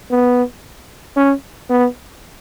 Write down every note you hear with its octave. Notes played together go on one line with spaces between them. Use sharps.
B3
C#4
B3